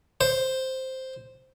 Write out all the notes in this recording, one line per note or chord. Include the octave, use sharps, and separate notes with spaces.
C5